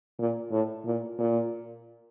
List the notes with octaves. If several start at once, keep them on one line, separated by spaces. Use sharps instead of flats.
A#2
A2
A#2
A#2